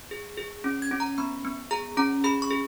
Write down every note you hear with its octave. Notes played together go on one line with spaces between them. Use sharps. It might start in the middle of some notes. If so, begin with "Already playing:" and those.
G#4
G#4
C#4
G#6
C#4
A#5
B3 B5
B3
G#4 A#5
C#4 A#5
G#4 B5
C#6
G#4